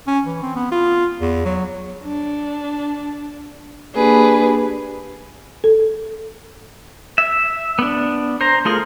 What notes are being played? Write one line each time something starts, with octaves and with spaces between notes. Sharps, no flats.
C#4
E3
C4
B3
F4
E2
F#3
D4
A#3 D4 G4 G#4 B4
A4
E5
B3 D4
C5 A#5
A3 F4 G#4 A#4